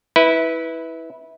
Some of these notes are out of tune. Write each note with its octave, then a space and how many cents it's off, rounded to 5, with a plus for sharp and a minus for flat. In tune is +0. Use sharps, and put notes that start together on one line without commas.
E4 -20 B4 +0